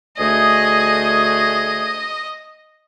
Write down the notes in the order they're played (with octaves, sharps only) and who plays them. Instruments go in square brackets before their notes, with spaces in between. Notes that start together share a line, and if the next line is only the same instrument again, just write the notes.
[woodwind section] D2 A3 G#4 [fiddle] D#5